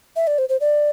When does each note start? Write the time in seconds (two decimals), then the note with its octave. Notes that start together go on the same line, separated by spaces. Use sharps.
0.16 E5
0.27 D5
0.38 C5
0.49 C5
0.61 D5